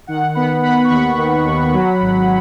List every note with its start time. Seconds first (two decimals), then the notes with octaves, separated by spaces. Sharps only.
0.07 D#3 F#5
0.35 B3 F#5 B5
0.63 D#3 F#5 B5
0.84 C#6
0.90 D#2 F#5 B5
1.18 D#3
1.45 D#2
1.73 F#3
2.01 G#1